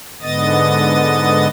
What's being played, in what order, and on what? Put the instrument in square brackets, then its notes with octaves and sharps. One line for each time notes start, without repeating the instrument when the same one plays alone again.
[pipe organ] G#2 D3 B3 D#5 D#6 A6